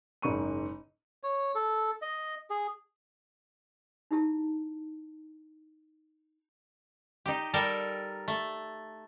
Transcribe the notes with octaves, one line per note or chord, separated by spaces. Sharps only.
F#1 G#2 C#6 D#7
C#5
A4
D#5
G#4
D#4 E4 G4 A5
D#4 G4
G3 A4 A#4
A3